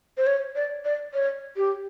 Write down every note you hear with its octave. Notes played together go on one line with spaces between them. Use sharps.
C5
C#5
D5
D5
C#5
G4